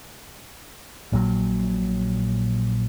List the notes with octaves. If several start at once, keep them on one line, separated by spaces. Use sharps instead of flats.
A#1 A#2 E3 F#3